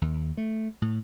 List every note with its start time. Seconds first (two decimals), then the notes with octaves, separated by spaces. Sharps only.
0.02 D#2
0.37 A3
0.82 A2